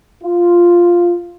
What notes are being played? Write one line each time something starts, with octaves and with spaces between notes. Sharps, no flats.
F4